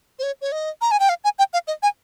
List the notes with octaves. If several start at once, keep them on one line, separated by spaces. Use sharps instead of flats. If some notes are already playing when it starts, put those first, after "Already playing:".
C5
C#5
C#5
D#5
A#5
G#5
G5
F5
G#5
G5
F5
D#5
G#5